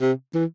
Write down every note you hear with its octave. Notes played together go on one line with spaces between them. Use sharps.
C3
E3